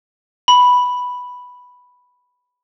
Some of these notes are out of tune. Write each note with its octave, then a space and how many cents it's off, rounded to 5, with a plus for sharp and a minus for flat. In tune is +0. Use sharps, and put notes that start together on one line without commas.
B5 +0